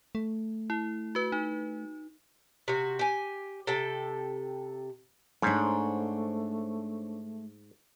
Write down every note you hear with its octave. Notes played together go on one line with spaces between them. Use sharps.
A3
E4
F#4 B4
D#4
C3 F#4
G4 G#5
C3 A4 G5
G#2 A3 D4 C5 C#5